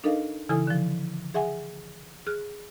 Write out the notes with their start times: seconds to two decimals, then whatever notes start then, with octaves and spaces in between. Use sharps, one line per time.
0.04 D4 D#4 A4 A#4 D#5 F5
0.49 C#3 E3 E4 A4 G#5 D#6
0.67 D3 F3
1.34 G#4 E5 F#5 G#5
2.27 G#4 F6 F#6